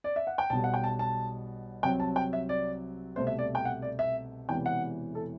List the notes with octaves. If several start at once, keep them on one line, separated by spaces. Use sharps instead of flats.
D5
E5
F#5
G5
B1 B2 G3 A5
F#5
G5
A5
A5
C2 C3 F#3 C4 G5
A5
G5
E5
D5
C2 B2 A3 C4 C5
E5
D5
G5
F#5
D5
E5
E1 E2 C3 E3 G5
F#5
A4